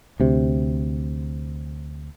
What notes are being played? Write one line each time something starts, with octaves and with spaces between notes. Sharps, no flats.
D2 C3